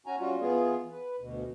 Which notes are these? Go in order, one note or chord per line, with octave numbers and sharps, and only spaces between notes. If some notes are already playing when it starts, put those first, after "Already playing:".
C#4 F#4 G#5 A#5
G3 C#4 F4 F#4
E3 B3 F4 G#4
B4
D2 B2